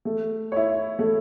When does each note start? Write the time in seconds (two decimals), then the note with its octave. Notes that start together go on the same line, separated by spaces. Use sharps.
0.05 A3
0.52 E4 C#5
0.99 A3